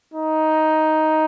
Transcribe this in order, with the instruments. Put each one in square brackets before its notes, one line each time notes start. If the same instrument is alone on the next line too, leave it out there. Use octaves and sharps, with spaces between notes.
[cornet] D#4